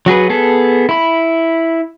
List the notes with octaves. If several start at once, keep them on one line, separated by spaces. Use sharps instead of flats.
F#3 F#4 G#4 B4
B3 G#4 A4
E4 B5